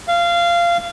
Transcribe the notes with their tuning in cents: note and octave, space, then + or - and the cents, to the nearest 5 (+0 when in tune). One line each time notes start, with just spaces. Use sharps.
F5 -20